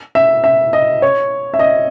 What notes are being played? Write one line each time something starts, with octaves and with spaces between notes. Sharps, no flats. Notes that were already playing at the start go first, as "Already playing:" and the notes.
E5
E5
D#5
C#5
E5
D#5